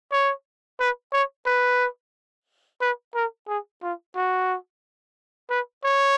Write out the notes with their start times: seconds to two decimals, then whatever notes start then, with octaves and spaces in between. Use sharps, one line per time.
0.12 C#5
0.80 B4
1.13 C#5
1.46 B4
2.81 B4
3.15 A#4
3.48 G#4
3.82 F4
4.16 F#4
5.50 B4
5.84 C#5